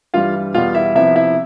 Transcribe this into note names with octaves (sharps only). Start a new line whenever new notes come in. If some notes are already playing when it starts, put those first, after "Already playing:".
G2 E3 G3 F4 F5
E2 B2 G3 B3 F4 F5
E4 E5
C3 F3 B3 E4 E5
E4 E5